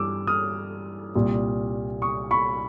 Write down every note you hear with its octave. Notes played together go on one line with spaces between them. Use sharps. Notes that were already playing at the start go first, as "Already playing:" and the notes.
Already playing: G2 E3 G3 D6 E6
D#6 F6
C2 A#2 G3
C#6 D#6
B5 C#6